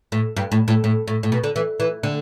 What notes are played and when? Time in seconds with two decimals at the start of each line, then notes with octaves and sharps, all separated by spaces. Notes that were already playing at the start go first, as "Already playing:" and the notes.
0.12 A2
0.37 G2
0.52 A2
0.68 A2
0.84 A2
1.08 A2
1.23 A2
1.32 B2
1.44 D3
1.56 E3
1.80 E3
2.03 D3